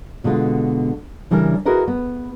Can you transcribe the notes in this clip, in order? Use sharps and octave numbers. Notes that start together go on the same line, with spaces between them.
B2 D3 G#3 F4
C#3 E3 G3 D4 A#4
E4 F#4 G#4 A#4 B4 D#5
B3